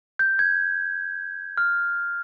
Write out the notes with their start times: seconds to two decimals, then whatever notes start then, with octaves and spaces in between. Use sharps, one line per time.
0.19 G6
0.39 G#6
1.58 F6